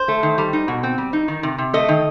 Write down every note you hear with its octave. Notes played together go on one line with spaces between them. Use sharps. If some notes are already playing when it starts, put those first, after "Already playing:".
Already playing: C5
A3
D#3
G3
D#4
B2
C4
G3
D#4
D#3
C3
C3
A3 D#5
D#3